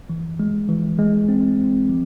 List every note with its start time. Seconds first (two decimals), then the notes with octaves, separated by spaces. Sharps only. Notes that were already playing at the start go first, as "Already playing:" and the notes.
0.10 E3
0.40 G#3
0.69 E3
0.99 G#3
1.29 C4
1.59 C4
1.89 F3